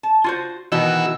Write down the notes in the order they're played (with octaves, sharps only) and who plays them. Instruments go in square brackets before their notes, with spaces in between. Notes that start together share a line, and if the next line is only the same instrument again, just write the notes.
[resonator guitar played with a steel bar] A5
F4 F#4 C5
[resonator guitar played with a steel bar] B2 D#3 D#5 [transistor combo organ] E3 F#4 E6